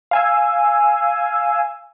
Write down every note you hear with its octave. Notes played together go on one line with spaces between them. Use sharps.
F5 G#5 E6